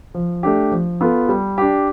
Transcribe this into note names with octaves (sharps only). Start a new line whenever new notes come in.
F3
A3 D4 G4
F3
B3 F4 A4
G3
D4 G4